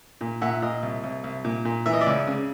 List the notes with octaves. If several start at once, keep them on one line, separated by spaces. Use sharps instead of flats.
A#2
A#2 E5 F#5
A#2 D#5 F5
C2
C2
C2
A#2
A#2
E3 E5
D#5
D5 E5
C#2
C#3